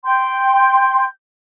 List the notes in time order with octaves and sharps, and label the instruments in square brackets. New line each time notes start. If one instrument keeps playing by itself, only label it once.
[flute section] G5 C6 G6